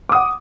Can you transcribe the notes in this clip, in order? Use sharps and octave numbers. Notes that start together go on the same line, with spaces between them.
F#5 D6 D#6